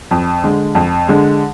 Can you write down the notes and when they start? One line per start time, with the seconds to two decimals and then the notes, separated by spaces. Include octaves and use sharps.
0.11 F2
0.44 D3 G#3
0.75 F2
1.08 D3 G#3